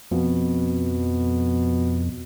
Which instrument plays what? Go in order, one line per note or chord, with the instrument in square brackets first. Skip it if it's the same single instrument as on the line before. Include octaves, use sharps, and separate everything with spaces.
[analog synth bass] F2 [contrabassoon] B2